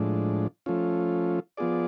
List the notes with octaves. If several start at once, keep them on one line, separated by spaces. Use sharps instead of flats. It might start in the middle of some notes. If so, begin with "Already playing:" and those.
Already playing: A2 F3 G#3 D4
F3 A3 C#4 F4
F3 B3 F4 G#4 D5